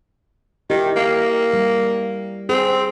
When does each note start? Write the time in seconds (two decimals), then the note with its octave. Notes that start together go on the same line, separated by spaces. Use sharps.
0.70 D#3 E4 G4
0.96 A#3
1.53 G3
2.49 C4 G#4